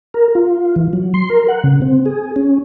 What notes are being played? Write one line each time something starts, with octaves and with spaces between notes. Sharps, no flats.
A#4
F4
E3
F#3
C6
A#4
F#5
C#3
C4
G#4
C#4